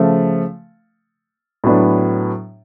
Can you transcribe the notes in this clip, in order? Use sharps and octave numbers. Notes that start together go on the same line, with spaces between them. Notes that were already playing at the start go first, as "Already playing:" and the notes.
Already playing: C#3 F3 A3
A2 F#3 B3 D4